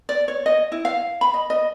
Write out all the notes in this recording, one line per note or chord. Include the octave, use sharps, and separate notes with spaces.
D5
C#5
D#5
E4
F5
B5
D#5
D#5